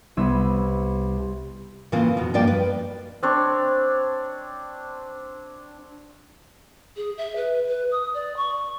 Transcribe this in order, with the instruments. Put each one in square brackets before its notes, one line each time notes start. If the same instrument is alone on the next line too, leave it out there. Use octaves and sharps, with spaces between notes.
[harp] C2 B3 E6 G#6
[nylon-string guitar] A2 C#3 E3 A#3 C4 F4
F2 B2
G2 F3 A#3 F4 D5 G5
B4
[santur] C4 D4 C#5
[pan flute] G#4
E5
B4
B4
D#6
D5
C#6